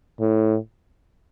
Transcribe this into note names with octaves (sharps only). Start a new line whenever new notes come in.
A2